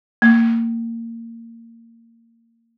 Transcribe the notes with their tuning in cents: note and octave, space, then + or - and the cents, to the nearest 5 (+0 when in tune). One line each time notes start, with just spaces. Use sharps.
A#3 -25